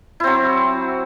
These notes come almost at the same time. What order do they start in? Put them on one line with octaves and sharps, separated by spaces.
E4 C4 F#3